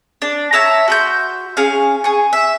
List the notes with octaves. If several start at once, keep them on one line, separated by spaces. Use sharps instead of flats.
D4
C#5 E5 A5 A#5
F#4 C6 G6
C#4 G#4 F5
G#4 C#6
E5